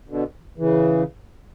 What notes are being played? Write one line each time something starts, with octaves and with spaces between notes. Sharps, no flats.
B2 D3
C#3 E3